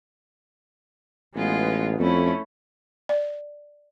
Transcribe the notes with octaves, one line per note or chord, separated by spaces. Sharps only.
A1 G#3 B3 F4
F2 A3 C#4 E4
D5